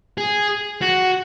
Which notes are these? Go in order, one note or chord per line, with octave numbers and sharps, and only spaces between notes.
G#4
F#4